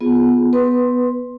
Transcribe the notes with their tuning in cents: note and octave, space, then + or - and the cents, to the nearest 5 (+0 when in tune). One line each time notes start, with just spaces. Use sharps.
B3 +0 F4 +0 G#4 +0
B3 +0 B4 +0 C6 +10